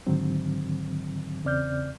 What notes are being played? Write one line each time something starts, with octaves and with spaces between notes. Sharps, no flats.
G#2 D3 D#3 F#3 C4
E2 C#3 C4 D5 F6 G6